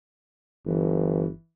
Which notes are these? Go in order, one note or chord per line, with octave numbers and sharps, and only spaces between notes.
G1 E3